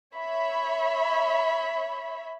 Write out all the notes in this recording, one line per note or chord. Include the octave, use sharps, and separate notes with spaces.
C#5 E5 B5